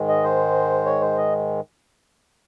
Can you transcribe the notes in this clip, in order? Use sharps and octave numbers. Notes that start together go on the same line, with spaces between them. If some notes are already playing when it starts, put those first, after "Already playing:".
Already playing: G#2 D#3 G#3
D#5
C5
C#5
C5
D#5